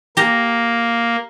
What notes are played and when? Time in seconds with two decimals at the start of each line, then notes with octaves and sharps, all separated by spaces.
0.17 A#3 G4 A#5